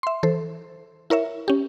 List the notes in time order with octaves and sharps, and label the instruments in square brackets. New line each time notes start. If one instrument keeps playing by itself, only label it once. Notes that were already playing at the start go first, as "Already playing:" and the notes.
[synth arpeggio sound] E5 C6
E3 A4 C5
E4 A#4 C#5 E5
C#4 G4